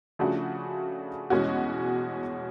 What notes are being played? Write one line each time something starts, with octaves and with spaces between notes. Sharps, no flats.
C#3 F3 A3 D4 F#4
E2 B2 G#3 C#4 F#4